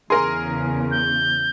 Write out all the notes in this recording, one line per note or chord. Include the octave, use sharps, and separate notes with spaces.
E2 C#3 G#4 A#4 C6
G6